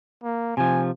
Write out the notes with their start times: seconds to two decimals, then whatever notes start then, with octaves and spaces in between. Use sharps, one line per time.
0.24 A#3
0.57 C3 F3 G#5